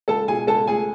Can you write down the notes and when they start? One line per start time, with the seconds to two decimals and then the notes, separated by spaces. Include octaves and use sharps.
0.08 C#2 A4 A5
0.28 B2 G#4 G#5
0.47 C#2 A4 A5
0.67 A3 G#4 G#5